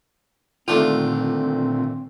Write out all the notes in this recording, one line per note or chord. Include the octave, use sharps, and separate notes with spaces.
A#2 D3 D#3 A3 C4 D4 F4 G4